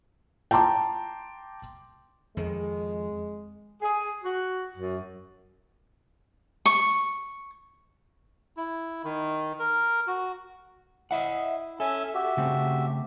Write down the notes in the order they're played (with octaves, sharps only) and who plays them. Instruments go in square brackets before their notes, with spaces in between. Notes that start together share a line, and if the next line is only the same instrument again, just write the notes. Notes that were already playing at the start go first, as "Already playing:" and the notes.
[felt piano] G5 A5 A#5 C6 D6
[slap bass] F2 D#3 [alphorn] G#3
[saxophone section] G#4
F#4
F#2
[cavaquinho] C#6
[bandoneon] E4
D#3
A#4
F#4
[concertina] E4 [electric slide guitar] D#5 E5 F#5
[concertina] C#4 E5 G#5 [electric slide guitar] A4
[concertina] F#4 G4 E5
[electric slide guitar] C#3 A3 C4